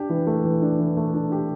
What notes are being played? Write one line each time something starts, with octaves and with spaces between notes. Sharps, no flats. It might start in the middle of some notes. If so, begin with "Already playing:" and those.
Already playing: D4 G4
E3
A3
E3
D4
E3
A3
D4
G4